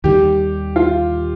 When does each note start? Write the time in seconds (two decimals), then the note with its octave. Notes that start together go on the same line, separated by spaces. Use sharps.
0.04 D#2 D#3 G3 G4
0.76 F4